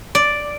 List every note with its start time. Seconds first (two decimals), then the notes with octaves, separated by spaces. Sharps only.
0.15 D5